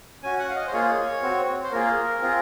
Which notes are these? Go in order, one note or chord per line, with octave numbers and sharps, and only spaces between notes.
C#4 F#4 G#5
F#5
F5
D#5
C5
A#3 F4 G#4 C#5
C4 F#4
C5
A#3 F4 G#4 A#4
C4 F4 G#4